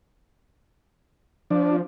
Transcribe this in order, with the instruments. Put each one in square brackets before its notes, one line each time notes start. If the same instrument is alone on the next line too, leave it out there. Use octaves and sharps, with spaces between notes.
[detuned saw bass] F3 [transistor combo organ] D4